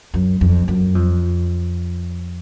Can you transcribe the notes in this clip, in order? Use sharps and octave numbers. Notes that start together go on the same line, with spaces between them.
F#2
F2
F#2
F2